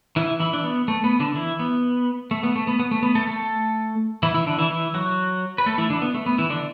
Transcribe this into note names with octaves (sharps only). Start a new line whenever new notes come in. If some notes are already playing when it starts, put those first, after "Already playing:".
E3 E4
E3 E4
D4
B3
A3
B3
D3 D4
E3 E4
B3
A3
B3
A3
B3
B3
A3
B3
A3 A4
A3 A4
E3 E4
E3 E4
D3 D4
E3 E4
E3 E4
F#3 F#4
B4
A3 A4
E3 E4
D3 D4
B3
A3
B3
E3 E4
D3 D4